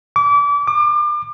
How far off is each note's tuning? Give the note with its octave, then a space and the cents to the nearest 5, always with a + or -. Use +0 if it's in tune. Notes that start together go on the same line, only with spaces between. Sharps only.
D6 -30
D6 +35